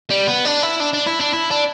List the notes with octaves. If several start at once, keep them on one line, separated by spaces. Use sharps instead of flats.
G3
B3
D4
E4
D4
D4
E4
D4
E4
D4